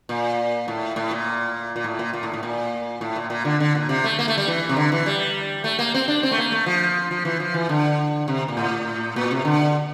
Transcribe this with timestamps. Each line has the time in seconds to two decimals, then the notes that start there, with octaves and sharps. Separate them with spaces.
0.09 A#2
0.68 A2
0.96 A2
1.11 A#2
1.76 A#2
1.84 A2
1.99 A#2
2.13 A#2
2.23 A2
2.33 A2
2.43 A#2
3.01 A2
3.16 A#2
3.30 A#2
3.45 D3
3.60 D3
3.75 A#2
3.89 C3
4.04 A3
4.19 A#3
4.28 A3
4.38 G3
4.47 E3
4.69 C3
4.77 D3
4.92 E3
5.06 G3
5.64 A3
5.79 A#3
5.94 C4
6.08 D4
6.23 C4
6.31 A3
6.38 A#3
6.52 A3
6.66 F3
7.11 F3
7.25 E3
7.40 F3
7.54 E3
7.69 D3
8.28 C3
8.48 A#2
8.57 A2
9.16 A#2
9.31 C3
9.45 D3